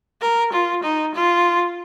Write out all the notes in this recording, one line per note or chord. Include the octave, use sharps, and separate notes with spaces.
A#4
F4
D#4
F4